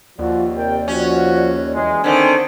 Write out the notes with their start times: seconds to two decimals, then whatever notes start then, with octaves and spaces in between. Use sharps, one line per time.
0.19 D#2 F3 F4 F#4 D5
0.55 C3 A#4 G5
0.88 F3 C#4 F#4
1.74 E3 F#3 G#3
2.04 D3 D#3 C4 D4 C5 G#5